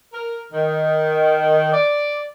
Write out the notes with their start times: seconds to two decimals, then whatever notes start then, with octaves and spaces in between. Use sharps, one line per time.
0.12 A#4
0.53 D#3
1.72 D5